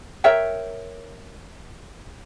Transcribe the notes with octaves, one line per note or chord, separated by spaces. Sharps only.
A#4 C#5 E5 G5